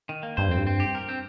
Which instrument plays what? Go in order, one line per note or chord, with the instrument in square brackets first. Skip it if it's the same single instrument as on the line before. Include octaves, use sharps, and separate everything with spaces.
[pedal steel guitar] D#3
A#3
[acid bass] G2 [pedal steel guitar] C5
[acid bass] F2 [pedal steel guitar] C4
[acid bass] G2
[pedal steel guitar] C4
G4
A#4
C4